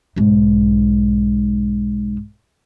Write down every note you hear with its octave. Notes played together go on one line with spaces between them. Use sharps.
B1 G#2